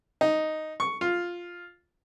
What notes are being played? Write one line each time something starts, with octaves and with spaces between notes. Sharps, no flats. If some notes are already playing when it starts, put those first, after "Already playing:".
D#4
C#6
F4